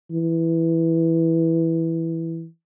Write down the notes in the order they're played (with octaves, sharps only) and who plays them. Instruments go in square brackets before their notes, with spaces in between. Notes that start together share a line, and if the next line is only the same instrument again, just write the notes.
[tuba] E3